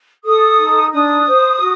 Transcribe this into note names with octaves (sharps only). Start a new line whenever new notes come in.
A4 D#6
D#4
D4 D#6
C5
F#4